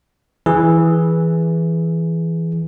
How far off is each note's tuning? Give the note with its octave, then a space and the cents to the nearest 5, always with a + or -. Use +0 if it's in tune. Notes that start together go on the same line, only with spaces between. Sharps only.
E3 +0 G#4 +0